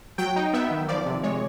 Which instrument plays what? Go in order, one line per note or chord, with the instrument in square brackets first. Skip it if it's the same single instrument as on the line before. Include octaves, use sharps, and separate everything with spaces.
[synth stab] F#3 G5
D#4
B3 E5
D#3
F3 D5
C3
G#3 C#5